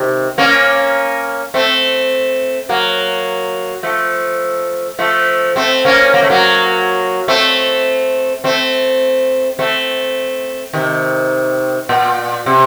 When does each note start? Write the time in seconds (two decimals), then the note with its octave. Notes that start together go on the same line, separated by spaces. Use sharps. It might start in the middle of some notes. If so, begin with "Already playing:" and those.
Already playing: C3 D#3
0.38 A#3 C#4
1.54 A3 C4
2.69 F#3 A#3
3.83 F3 A3
4.99 F3 A3
5.56 A3 C4
5.85 A#3 C#4
6.14 A#3
6.22 A3
6.30 F#3 A#3
7.28 A3 C4
8.44 A3 C4
9.59 A3 C4
10.73 C3 D#3
11.89 A#2
12.46 C3